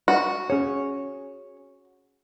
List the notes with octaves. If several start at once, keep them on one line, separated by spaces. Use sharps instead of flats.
F#4
C#4 G#4 C#5